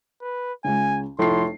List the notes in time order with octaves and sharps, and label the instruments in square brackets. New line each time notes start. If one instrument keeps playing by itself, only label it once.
[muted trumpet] B4
[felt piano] C#2 C#3 [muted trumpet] G#5
[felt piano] F1 F4 C7 [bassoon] A2 [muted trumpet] C6